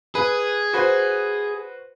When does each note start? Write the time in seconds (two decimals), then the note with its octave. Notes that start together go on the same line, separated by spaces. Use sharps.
0.15 G#4 B4
0.73 F#4 B4 C5